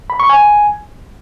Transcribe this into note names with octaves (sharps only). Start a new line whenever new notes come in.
B5
C#6
G#5